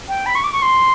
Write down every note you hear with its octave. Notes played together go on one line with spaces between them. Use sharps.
G5
B5
C#6
D6
C#6
C6